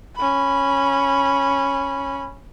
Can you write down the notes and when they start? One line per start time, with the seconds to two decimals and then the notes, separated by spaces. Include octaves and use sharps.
0.16 C#4 B5